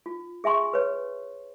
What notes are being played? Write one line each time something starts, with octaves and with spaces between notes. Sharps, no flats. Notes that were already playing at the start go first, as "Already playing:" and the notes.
F4
G#4 E5 G#5 C6 C#6
B4 C#5